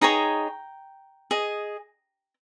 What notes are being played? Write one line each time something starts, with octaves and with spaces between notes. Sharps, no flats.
D#4 G#4 C#5 G5 A#5
G#4 D#5